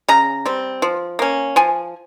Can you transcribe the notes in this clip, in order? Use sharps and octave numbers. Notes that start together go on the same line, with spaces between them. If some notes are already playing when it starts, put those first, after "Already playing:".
C#3 A#5
G3 C4
F3
A#3 C#4
F3 G#5